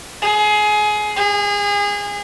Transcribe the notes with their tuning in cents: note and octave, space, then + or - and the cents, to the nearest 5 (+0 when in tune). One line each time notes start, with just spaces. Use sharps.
G#4 +20
G#4 -30